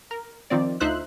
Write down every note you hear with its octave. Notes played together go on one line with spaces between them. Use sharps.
A#4
D#3 F3 C4 D5
D2 D#4 F4 C5 E5 F#6